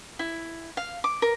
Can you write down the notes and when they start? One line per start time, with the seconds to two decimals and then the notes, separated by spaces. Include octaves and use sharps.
0.19 E4
0.77 F5
1.04 D6
1.22 A#4